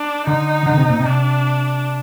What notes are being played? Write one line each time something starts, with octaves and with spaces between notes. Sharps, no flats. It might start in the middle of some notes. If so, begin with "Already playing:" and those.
Already playing: D4
D3 D#4
D3
C3
A#2
C3
D4